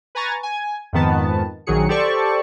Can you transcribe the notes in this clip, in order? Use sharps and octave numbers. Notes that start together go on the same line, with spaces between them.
B4 G#5 A#5 C#6 A6
G#5
F2 G#2 D#3 B3 A5
A#1 D#3 F#3 G#4 C#7
G4 A4 C5 D5 A5 C#6